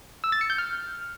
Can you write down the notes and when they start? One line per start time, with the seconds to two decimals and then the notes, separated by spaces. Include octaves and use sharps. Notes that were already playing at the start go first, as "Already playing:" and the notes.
0.24 E6
0.32 A6
0.41 C#7
0.50 G6
0.58 F6